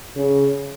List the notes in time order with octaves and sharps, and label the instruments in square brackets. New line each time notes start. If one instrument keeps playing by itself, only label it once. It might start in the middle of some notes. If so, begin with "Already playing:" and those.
[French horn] C#3